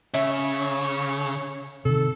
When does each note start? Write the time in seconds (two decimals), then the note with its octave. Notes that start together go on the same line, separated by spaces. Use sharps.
0.14 C#3 C#5 E5
1.85 C3 D#3 A4